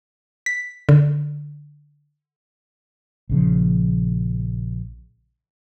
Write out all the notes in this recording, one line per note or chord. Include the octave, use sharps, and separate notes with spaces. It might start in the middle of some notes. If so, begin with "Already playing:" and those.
B6
D3
A#1 C#3 F3